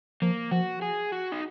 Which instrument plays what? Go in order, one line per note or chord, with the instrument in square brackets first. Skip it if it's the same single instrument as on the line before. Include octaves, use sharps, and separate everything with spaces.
[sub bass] F3 [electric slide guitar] A#3
[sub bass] F3 [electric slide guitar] F#4
[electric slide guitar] G#4
F#4
D#4